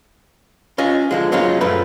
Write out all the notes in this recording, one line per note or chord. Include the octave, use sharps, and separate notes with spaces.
C#4 F4 D#5 G#5
D3 F3 G#3
C#3 F#3 G#3 A#3 C#4 F4
C#2 F#2 A#2 F3 A3 B4